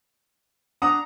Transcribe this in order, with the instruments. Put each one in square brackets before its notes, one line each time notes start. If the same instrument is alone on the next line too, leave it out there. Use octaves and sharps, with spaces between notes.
[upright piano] D4 F#5 D#6 [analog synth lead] A#5